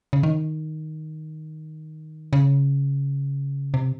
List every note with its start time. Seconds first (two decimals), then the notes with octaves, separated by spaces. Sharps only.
0.13 C#3
0.23 D#3
2.33 C#3
3.74 C3